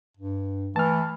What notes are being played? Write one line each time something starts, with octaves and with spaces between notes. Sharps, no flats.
G2
E3 A3 A5 F6